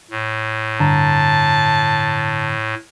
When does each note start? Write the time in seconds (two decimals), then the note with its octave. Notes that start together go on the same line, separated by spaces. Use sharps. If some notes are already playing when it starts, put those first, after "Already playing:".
0.11 A2
0.80 G2 D3 A5 A#5